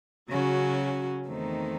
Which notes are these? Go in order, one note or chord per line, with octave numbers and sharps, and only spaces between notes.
C#3 F#3 C#4 F#4
E2 D#3 A3 C4 D#4